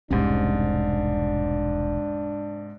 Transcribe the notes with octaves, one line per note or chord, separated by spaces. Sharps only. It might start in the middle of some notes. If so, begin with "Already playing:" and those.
E1 C2 G#2 C3 C#4 D4